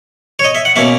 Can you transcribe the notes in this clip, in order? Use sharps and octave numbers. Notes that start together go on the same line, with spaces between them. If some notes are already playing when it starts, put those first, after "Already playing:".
C#5
D#5
E5
F#5
B2 A#3 C#4 E5